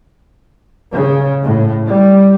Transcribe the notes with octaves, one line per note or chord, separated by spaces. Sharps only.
C#3
A2
G3